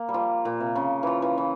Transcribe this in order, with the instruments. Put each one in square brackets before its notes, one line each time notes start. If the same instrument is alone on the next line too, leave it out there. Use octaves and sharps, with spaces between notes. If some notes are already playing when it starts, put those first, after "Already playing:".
Already playing: [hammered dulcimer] A#3
G3
F3
A#2
C3
C#3
E3 F3
E3
E3